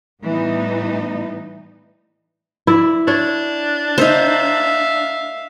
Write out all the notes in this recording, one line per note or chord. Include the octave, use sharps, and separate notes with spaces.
A2 E3 G3 B3 D#4
E4 D5
D4 C#5
D#4 C5 E5 F5